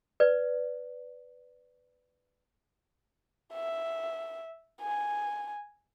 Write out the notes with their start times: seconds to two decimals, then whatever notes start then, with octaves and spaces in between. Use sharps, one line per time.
0.20 B4 D5
3.54 E5
4.81 G#5